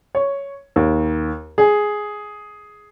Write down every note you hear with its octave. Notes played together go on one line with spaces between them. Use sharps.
C#5
D#2
G#4